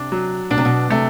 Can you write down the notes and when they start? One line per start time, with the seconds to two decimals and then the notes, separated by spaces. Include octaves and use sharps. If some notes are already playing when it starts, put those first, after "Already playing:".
Already playing: C3 D4
0.12 F#3
0.50 B2 D4
0.58 C3
0.65 B2
0.90 C3 A3